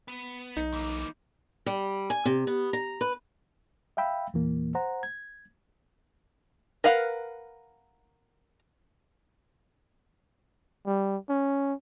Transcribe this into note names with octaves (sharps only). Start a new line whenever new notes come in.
B3
B1 D#4
E3 A#3
G3
G#5
C3
B3
A#5
B4
E5 F5 G5 B5 E6
E2 A#2 E3 A#3
C5 F#5 A#5
G#6
A#4 B4 F5 F#5
G3
C#4